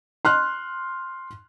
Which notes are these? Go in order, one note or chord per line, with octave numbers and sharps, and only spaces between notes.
C6 F6 F#6